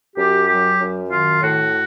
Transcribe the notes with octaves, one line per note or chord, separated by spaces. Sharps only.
F#2 G4
F#3 G4
F#2
D#3 F4
A2 F#4